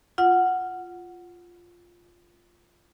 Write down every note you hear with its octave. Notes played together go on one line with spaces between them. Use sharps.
F4 F#5